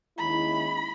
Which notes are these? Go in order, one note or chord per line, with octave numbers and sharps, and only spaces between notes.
D#2 D#3 G#3 C#4 E4 B5